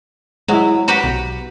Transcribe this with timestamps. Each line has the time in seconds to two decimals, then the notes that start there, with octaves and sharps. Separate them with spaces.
0.48 F#3 G#3 E4
0.88 F#4 G4 B4 A#5
1.04 B1